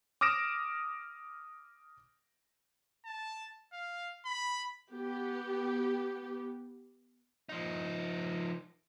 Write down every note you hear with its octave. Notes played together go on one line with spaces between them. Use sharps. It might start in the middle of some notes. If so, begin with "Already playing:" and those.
D6 D#6 F6 A#6 D7 E7
A5
F5
B5
B3 G4
F3 D#4